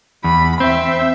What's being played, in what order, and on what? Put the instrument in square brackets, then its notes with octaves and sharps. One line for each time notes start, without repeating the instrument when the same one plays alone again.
[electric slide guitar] E2 [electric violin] B5
[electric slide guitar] C4 [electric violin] E5